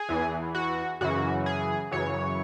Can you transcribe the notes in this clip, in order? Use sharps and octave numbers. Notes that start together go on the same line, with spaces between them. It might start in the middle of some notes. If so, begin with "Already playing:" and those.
Already playing: G#4
E2 E3
F#4
F#2 C#3 E3 F#4
G#4
F#2 C#3 E3 C#5